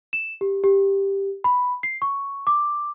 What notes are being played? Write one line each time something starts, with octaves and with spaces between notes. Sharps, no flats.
E7
G4
G4
B5
C7
C#6
D6